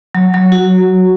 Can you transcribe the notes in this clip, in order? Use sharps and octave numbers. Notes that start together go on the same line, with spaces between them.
F#3
F#3
F#4